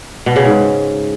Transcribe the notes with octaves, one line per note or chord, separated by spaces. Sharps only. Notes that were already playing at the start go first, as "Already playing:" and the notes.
B2
C#3
G#2